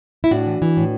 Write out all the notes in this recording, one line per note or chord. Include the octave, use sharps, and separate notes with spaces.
E4
A2 D4 F#4
E3
E3
A2